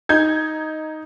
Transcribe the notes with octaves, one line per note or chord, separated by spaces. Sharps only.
D#4 G6 G#6